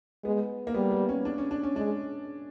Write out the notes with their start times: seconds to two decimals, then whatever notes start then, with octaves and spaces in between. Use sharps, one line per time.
0.24 G#3 B3
0.67 A#3
0.75 G3 B3
0.91 B3
1.09 C#4
1.25 D4
1.38 C#4
1.51 D4
1.63 C#4
1.75 G#3 D4